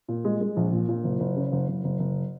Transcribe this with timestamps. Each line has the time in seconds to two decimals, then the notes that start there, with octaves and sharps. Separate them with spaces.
0.08 A#2
0.25 G#3
0.41 G#3
0.56 A#1
0.72 A#2
0.89 A#2
1.04 F#1
1.20 F#1
1.36 C#3
1.52 F#1
1.68 F#1
1.84 F#1
1.99 F#1